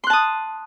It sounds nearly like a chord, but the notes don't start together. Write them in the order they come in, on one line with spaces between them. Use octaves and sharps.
C6 F#6 A5 D#6